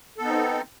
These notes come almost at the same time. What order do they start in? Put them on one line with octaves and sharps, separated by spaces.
A4 B3 D#4 C4